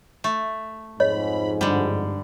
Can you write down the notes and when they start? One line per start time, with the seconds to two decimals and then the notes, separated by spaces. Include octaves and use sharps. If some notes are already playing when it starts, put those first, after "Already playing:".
0.24 A3
1.00 F2 G#2 C#5 D#5 B5
1.61 G2 D3 G3